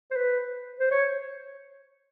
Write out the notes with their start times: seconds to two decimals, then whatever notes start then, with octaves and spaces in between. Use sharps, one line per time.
0.11 C5
0.16 B4
0.79 C5
0.91 C#5